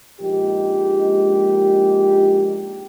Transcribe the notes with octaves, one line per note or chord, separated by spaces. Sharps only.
A#1 G#3 D#4 G4